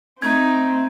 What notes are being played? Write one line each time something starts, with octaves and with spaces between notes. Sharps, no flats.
A3 C4 D#4 G#6